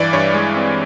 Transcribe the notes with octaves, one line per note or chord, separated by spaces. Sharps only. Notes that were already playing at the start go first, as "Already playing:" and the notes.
Already playing: G2 E3 D5
G2 C#5
G#3
C4